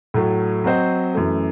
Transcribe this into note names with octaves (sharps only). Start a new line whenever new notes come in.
A2 F#3 A3
F#3 C4 F#4 C5 D#5
F#2 E3 A3